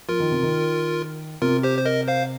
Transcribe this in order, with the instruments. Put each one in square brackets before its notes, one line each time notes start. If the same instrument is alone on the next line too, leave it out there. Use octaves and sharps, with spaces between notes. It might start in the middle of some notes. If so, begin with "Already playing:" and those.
[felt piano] F3 [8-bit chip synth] F4 A#4
[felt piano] D#3
C3
D#3
[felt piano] C3 [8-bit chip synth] F4 A#4
[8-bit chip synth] G4 C5
C5
A#4 D#5
C5 F5